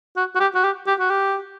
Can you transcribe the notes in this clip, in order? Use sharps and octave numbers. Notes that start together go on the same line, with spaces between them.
F#4
F#4
G4
F#4
G4
G4
F#4
G4